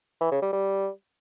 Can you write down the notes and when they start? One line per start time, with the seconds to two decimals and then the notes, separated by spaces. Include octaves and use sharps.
0.21 E3
0.32 C#3
0.42 G3
0.53 G3